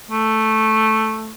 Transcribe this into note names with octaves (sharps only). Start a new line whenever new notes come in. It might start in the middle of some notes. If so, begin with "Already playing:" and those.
A3